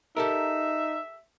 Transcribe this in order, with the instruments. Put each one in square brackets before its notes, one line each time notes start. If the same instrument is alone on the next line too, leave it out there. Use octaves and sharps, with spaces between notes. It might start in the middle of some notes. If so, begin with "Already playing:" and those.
[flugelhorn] D#4 [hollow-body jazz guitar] G4 A4 A#4 [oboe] E5